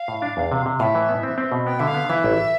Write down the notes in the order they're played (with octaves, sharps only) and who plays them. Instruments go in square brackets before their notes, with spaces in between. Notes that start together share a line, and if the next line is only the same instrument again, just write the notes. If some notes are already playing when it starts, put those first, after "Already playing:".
Already playing: [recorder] F5
[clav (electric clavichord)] A2
D4
E2
C3
C3
[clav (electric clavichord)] A2 [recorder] E5 F5
[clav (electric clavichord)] E3
B3
C4
C4
B2
[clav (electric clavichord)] B3 [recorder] G5
[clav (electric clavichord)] D3 [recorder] E5
[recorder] F5
[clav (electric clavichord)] B3
[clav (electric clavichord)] E3 [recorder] E5
[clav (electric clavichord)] A1